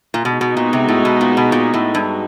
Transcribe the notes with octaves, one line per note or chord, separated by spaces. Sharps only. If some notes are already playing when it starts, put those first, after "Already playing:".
A#2
B2 G#3 B3 D#4 F#4
B2
A#2
C3
A2
B2
A#2
B2
A#2
A2
G2